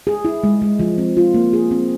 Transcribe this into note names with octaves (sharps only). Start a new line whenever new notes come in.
G#4
E4
G#3
G#3
F3
C4
F4
A#3
G#4
C4